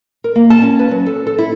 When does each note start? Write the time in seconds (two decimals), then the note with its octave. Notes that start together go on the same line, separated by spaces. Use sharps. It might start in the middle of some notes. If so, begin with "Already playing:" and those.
0.24 A#4
0.36 A#3
0.50 A5
0.62 C#4
0.79 B4
0.91 F#3
1.06 A4
1.27 A4
1.38 E4